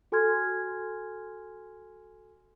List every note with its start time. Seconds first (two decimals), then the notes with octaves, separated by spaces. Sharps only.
0.12 F#4 A4 G#5 C6 F6 G#6